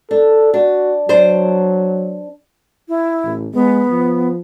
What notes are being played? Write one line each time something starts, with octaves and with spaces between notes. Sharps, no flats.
D4 A4
D4 F#4
F#3 D4 C5
E4
A1
G#3 B3
F3